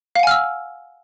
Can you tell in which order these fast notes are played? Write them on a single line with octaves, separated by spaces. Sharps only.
F5 F#5 G#5 F6 E6